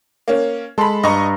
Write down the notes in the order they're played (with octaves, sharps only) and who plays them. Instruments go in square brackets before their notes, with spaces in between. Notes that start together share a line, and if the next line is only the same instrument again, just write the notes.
[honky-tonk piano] A#3 C#4
[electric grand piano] G#3 C6 [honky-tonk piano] A4 B5
[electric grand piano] G2 A#5 C#7 [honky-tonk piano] D#5 C#6